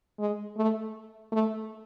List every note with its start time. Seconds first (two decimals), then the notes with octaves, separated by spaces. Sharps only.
0.19 G#3
0.57 A3
1.32 A3